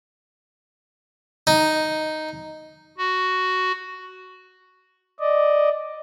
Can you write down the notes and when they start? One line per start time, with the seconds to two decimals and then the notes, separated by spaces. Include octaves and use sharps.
1.47 D#4
2.98 F#4
5.20 D5 D#5